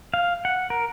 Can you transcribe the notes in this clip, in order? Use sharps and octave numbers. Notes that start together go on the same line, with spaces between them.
F5
F#5
A#4